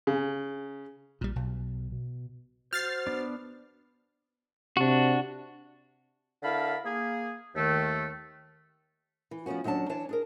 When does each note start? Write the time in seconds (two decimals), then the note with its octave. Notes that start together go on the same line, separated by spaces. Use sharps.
0.07 C#3
1.21 A#1 A#2 G3
1.36 B1 B2
1.92 B2
2.73 F#4 C5 F6 G6 A6 C7
3.07 B3 D4
4.77 C3 D4 F#4
6.43 D3 E4 A#4 F5 A5 B5
6.85 A#3 G#4
7.55 D#2 D#3 A3
9.31 E3
9.46 F3 A3 B3 C#4 F#4
9.64 D#2 F#3 C#4 D4 A5
9.89 E3 D4 C#5 A5
10.09 D4 G#4 A#4